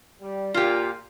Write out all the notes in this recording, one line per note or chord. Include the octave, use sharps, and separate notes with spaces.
G3
A#2 F4 G4